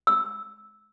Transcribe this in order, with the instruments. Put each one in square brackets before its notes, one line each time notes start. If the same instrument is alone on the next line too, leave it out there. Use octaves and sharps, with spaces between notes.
[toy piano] E6